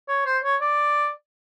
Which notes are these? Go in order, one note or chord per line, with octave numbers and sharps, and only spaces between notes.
C#5
C5
C#5
D5